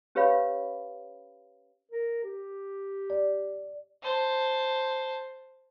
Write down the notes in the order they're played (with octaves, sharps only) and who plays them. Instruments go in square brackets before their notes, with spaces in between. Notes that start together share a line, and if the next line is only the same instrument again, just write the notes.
[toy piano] C#4 G4 B4 C#5 F5 B5
[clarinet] A#4
G4
[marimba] D5
[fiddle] C5 A5